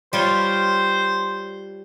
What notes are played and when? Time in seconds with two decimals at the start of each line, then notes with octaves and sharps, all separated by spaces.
0.13 G3 F4 C5 C#5